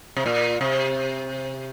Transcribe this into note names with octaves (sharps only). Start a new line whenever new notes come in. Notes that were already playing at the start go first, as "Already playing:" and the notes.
C3
A#2
C3